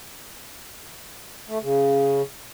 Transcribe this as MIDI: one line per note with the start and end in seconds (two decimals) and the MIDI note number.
1.48 1.58 57
1.62 2.22 49